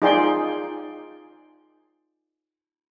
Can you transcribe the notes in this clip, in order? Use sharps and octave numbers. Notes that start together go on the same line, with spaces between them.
D#4 F4 G#4 D5 G5 C6